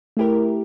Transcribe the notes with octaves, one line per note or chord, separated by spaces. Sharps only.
A3 E4 G4 A#4